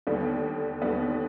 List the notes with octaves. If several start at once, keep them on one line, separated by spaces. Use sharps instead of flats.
D#2 D3 G3 B3
D#2 D3 G3 B3